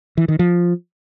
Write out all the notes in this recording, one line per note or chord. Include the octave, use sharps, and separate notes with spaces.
E3
D#3
F3